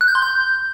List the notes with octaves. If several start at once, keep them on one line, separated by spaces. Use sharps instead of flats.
F#6
G6
C6
G6